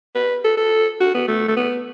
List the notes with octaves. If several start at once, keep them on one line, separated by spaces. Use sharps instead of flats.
B4
A4
A4
F#4
B3
A3
A3
B3